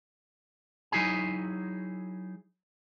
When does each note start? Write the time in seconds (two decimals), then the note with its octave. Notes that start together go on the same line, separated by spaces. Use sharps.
0.92 F#3 D#4 E4 G#4 G#5